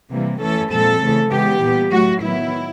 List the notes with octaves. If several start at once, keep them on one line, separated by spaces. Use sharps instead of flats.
C3 E3 G3 A#3
E3 A3 C#4 A4
A#2 F3 G#3 C4 A4
C#3 E3 A3
C#3 E3 G#3 B3 G4
A#2 G3 B3
A2 F#3 A3 F#4
D#3 F#3 B3 E4